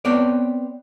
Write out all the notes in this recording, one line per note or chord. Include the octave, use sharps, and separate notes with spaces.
B3 C4 C#5 D5